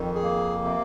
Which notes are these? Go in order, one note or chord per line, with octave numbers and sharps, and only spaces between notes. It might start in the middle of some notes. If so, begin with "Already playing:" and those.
Already playing: F2 D#3
G#4
A#3
C3